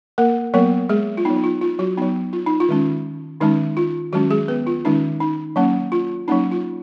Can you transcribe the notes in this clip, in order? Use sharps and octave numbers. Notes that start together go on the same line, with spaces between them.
A#3 A#4
F#3 A#3 B3 A#4
G#3 G#4
F4
F#3 B3 D#4
D#4
F4
F4
F#3 F#4
F#3 B3 D#4
F4
D#4
F4
D#3 G#3 C#4
D#3 G#3 C#4 D#4
F4
D#3 F#3 G#3 C#4 F#4
G#3 G#4
B3 B4
F4
D#3 G#3 C#4 D#4
D#4
F#3 A#3 C#4
F4
F#3 A#3 C#4 D#4
F4